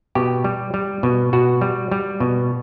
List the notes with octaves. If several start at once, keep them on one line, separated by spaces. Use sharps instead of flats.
B2 G4
G3
G3
B2
B2 F#4
G3
G3
B2